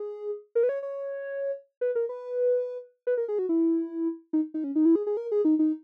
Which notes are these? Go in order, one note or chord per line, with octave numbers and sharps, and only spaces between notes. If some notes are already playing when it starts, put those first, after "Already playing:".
Already playing: G#4
A#4
B4
C#5
C#5
B4
A#4
B4
B4
A#4
G#4
F#4
E4
D#4
D#4
C#4
D#4
E4
G#4
G#4
A#4
G#4
D#4
D#4